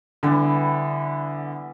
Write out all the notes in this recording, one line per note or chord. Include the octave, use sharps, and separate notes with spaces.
D3 E3 G3 B3